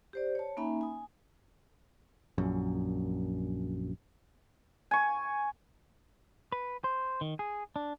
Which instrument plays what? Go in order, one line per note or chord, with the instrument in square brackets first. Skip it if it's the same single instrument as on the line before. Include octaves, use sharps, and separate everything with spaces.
[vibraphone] G4 C5 D5
C#5 A5
A#3 C#4 D#4 E5 G#5 B5
G#5 D#6
[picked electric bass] A#1 F#2
[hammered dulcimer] G#5 C#6
[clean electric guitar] B4
C5
D#3
G#4
D4